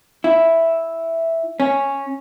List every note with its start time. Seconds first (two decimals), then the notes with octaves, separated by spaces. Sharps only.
0.24 E4
1.60 C#4